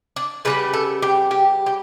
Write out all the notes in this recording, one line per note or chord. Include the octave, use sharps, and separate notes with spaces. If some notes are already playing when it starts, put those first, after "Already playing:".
D4
C#3 G3 B3 B4
A4
G4
G4
G4